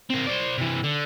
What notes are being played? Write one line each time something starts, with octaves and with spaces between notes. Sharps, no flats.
C4 A#4
C5 D5
C3 E3
D3